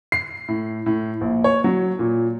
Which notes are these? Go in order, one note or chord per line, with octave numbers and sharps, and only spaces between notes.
C7
A2
A2
A#1
C#5
F#3
A#2